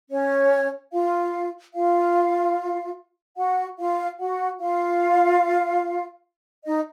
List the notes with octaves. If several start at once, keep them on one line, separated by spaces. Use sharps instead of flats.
C#4 C#5
F4 F5
F4 F5
F#4 F#5
F4 F5
F#4 F#5
F4 F5
D#4 D#5